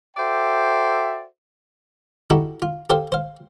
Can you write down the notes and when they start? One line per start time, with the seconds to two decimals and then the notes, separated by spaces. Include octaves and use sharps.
0.17 F#4 A4 C5 D5 E5 G5
2.30 D#4 E4 F#4 G4 A4
2.62 F4
2.90 G4 A4 C5 F5 G5
3.12 C5 F5